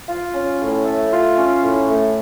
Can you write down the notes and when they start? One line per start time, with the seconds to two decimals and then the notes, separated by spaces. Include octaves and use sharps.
0.08 F4
0.34 C#4
0.59 A2
0.85 A3
1.11 F4
1.37 C#4
1.63 A2
1.89 A3